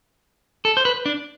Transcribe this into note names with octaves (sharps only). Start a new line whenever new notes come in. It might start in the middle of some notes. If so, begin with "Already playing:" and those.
A4
C5
B4
D4